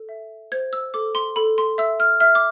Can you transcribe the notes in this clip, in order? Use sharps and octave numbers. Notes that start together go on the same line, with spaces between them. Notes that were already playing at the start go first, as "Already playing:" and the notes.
Already playing: A4
E5
C5 G#6
E6
A4 D6
C6
A4 B5
C6
E5 E6
F6
E5 F6
D6